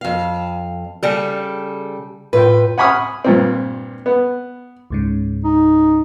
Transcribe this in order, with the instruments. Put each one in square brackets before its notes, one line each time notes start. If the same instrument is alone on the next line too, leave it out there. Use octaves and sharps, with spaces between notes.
[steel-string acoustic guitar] F2 F5
[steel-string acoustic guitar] C#3 G3 A4 [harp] F6 C#7
[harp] A2 F4 G5 [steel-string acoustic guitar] B4
[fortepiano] F#5 G#5 B5 C#6 D#6 F6
G2 A#2 C4
B3
[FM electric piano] C#2 G#2 C#3
[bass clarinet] D#4